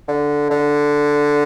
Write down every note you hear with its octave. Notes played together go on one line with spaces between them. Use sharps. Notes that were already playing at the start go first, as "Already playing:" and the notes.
D3
D3